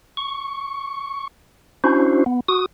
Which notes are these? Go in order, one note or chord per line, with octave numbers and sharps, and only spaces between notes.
C#6
C#4 D4 E4 F#4 C5
B3
F#4 D#6